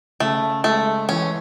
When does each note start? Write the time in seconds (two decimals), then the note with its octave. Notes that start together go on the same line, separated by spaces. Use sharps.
0.20 C#3 A3
0.64 G#3 A3
1.09 E3 C#4